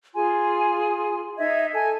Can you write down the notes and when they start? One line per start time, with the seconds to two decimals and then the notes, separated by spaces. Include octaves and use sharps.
0.14 F4 G#4 G#5 C6
1.37 D#4 D#5 E5 G#6
1.74 A4 G#5 G#6